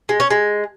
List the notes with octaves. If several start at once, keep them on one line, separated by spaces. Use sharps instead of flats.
G#3
C#4
G#3